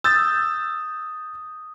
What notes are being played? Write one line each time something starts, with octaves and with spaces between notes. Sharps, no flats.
D#6 E6 G6 A6